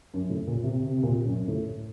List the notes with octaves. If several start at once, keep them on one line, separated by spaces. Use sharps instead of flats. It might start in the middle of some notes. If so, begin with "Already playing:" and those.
F#2
A2
A#2
C3
C3
C3
A#2
F#2
A2